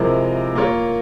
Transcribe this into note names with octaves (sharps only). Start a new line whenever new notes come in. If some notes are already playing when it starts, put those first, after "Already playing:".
Already playing: C3 F3 G#3 E4 A#4
A#3 F4 A#4 C#5